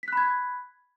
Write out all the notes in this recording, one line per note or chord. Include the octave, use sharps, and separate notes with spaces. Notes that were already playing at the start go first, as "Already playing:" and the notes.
B5 F#6 G#6 B6